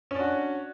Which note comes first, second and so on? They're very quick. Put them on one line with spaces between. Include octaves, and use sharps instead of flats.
C#4 D4 F#4